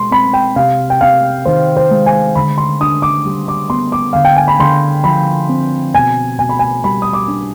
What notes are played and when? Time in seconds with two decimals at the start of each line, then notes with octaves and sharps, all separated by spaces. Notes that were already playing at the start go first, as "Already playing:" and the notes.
Already playing: B2 G#3 C6
0.11 C4 B5
0.33 G5
0.56 C3 F5
0.90 G5
1.01 C3 F5
1.45 D#3 C5
1.77 C5
1.91 G#3
2.06 G#5
2.35 D3 B5
2.58 C6
2.80 D4 D#6
3.02 D6
3.25 G3
3.48 D6
3.69 B3 C6
3.92 D6
4.13 D3 F5
4.25 G5
4.36 G#5
4.48 B5
4.59 D3 C6
5.04 F3 B5
5.49 C4
5.94 B2 G#5
6.38 B2 G#5
6.49 B5
6.59 G#5
6.84 G3 B5
7.02 D#6
7.13 D6
7.28 D4